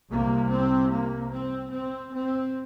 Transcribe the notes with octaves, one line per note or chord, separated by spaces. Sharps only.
C2 C3 A#3
C4
A#3
C4
C4
C4